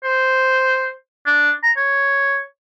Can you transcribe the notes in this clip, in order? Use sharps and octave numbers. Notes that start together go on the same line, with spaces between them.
C5
D4
A#5
C#5